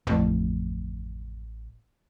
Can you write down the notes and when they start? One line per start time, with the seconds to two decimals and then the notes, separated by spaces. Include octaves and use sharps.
0.07 D1 A1 F2 A3